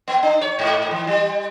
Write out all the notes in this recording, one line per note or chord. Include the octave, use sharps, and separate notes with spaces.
B3
D4
C#5
G#2
E3
G3